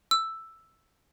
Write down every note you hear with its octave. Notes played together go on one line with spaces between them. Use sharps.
E6